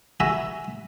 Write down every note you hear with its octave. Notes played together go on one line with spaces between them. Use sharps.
F#4 E5 G#5 A#5 B5